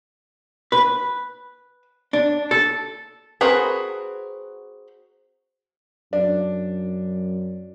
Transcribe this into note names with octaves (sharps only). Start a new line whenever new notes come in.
B4
D4
A4
C4 F#4 G#4 A#4 B4
F#2 D4